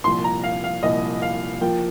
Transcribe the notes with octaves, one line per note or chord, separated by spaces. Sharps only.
C2 A#2 F3 C6
A#5
F5
F5
C2 A#2 F3 D#5
F5
F3 A#3 F4 G5